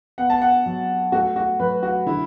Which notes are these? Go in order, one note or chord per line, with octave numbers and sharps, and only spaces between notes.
B3 F#5
A5
F#5
F#3
A3 F#4
F#4
F#3 B4
F#4
D3 E4